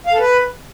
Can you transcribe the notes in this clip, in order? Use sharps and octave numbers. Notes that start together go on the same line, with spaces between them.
F5
A4
B4